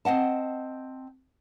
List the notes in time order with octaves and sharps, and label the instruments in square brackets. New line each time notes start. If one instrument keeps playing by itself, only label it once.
[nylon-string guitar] C4 D#5 F#5 A5